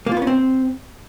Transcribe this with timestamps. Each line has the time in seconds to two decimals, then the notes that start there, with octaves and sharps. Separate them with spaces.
0.06 A#3
0.12 F4
0.17 B3
0.22 C#4
0.27 C4